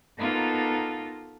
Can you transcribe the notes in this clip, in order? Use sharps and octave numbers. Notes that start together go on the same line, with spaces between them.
A#3 B3 D#4 F4 A4